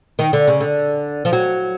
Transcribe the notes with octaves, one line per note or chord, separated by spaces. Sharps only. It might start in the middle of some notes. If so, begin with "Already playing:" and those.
D#3
D3
C#3
D3
F3
F#3